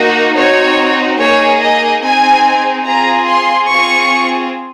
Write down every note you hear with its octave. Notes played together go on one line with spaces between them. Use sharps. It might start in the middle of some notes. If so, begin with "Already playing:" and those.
Already playing: A#3 D#4 F#4
C4 D#4 F#4 C#5
A#3 D#4 G#4 C#5
D#5
C4 D#4 G#4 G#5
C4 F4 G#4 A#5
C6
C4 F4 G#4 C#6